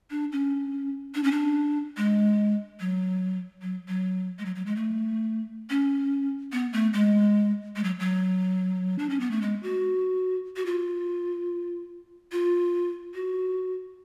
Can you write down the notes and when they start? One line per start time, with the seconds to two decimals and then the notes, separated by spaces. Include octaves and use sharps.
0.11 D4
0.32 C#4
1.15 D4
1.23 C#4
1.32 D4
1.97 G#3
2.80 F#3
3.62 F#3
3.88 F#3
4.39 G#3
4.45 F#3
4.55 F#3
4.66 G#3
4.76 A3
5.70 C#4
6.52 B3
6.73 A3
6.93 G#3
7.76 G#3
7.84 F#3
8.00 F#3
8.99 D4
9.10 C#4
9.20 B3
9.31 A3
9.42 G#3
9.63 F#4
10.56 F#4
10.66 F4
12.32 F4
13.14 F#4